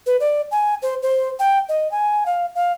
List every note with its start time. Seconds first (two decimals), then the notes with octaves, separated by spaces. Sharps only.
0.06 B4
0.20 D5
0.51 G#5
0.82 C5
1.03 C5
1.39 G5
1.69 D#5
1.92 G#5
2.26 F5
2.55 F5